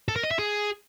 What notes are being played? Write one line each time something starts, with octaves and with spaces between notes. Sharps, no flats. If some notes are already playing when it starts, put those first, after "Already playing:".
A4
A#4
D#5
E5
G#4